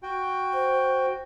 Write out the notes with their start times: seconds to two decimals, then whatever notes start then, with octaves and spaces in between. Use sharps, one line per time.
0.03 F#4 G5
0.54 C5